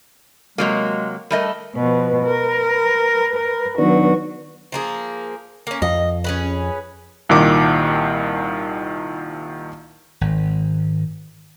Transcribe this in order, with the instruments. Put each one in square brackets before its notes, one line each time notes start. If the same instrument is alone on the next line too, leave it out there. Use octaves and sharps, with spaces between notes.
[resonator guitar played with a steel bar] C3 F#3 A#3 [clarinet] G#3
[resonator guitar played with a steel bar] G3 A3 D#5 [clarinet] A#4
[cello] B2 F3 [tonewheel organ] B4
[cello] A#4
A#4
[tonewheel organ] D#3 B3 D4 [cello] F#3 F#4
[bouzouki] F3 A#3 G#4
A#3 C#4
[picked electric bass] F2 [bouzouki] D#5
[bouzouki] C#4 G#4 B4
[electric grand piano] C2 A#2 D#3 D6
[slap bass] G#1